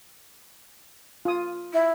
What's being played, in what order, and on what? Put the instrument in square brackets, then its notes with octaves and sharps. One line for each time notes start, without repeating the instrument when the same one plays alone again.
[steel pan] F4 D#6
[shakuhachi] E4